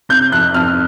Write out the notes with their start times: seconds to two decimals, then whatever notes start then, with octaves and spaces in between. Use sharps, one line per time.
0.09 C3 G6
0.31 F2 F#6
0.54 F2 F6